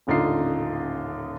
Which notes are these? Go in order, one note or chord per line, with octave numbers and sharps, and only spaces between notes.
D#1 A1 D3 D#4 F4 C7